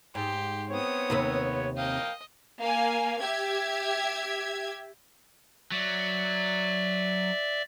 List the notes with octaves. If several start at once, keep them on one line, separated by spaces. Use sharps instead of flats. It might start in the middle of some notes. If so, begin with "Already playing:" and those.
G#2 G4 C6
B3 C4 C#5 D#6
D#2 C3 B4
A#4 D#5 F5 G5
A#3 F5 G#5
G4 E5 G#6
F#3 D5 E5